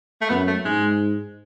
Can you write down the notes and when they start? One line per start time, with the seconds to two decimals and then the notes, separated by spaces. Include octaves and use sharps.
0.21 A3
0.30 F#2 B3
0.48 A3
0.65 G#2 G#3